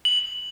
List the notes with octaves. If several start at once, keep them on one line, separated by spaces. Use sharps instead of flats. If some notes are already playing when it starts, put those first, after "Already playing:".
F#7